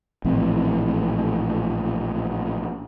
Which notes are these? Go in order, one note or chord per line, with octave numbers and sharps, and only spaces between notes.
A#1 A2 E3 C4